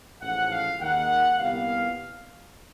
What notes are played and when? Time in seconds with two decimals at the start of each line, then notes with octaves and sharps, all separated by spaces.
0.22 A1 G#2 F3 F#5
0.51 F5
0.80 D#2 D#3 G#3 F#5
1.39 C2 A#2 G3 B3 F5